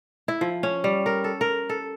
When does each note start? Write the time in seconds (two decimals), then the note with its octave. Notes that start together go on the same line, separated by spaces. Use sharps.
0.28 E4
0.41 F3
0.63 C#4
0.84 G3
1.06 A#4
1.24 A4
1.41 A#4
1.69 A4